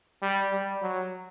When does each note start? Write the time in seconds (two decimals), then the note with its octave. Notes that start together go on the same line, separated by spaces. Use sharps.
0.22 G3
0.52 G3
0.82 F#3